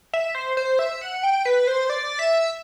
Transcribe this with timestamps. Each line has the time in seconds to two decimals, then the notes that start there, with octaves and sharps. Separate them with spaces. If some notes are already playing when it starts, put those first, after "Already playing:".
0.13 E5
0.35 C5
0.57 C5
0.79 E5
1.01 F#5
1.23 G5
1.45 B4
1.67 C5
1.90 D5
2.19 E5